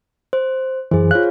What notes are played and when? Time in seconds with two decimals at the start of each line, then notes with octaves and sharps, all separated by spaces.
0.33 C5
0.91 F#2 E3 G#4 C5
1.11 F4 C#5 F5 F#6